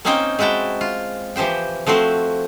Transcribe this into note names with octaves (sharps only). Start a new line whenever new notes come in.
A#3 C4 C#4 D#4 C5 G5
G#3 E4 F#4 G5 A5
F4
E3 F3 G4 C5 G5
F3 A3 C4 F#4 C5